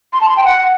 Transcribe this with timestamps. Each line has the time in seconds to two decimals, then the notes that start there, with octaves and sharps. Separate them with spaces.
0.13 C6
0.21 A5
0.29 C6
0.37 G5
0.45 F#5